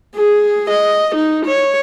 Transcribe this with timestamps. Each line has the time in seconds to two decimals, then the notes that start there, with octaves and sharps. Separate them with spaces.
0.15 G#4
0.70 D#5
1.15 D#4
1.46 C#5